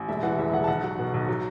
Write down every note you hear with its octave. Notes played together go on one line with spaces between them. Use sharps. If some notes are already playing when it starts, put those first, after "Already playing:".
Already playing: A1
E1 E5
E3 F#5
E2 E5
E1 F#5
A5
B1 F#5
F#3
B2
B1
F#3